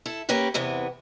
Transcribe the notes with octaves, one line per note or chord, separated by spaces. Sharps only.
E4 A4
A#3 C#4 G4 B4
E2 C3 E3 B3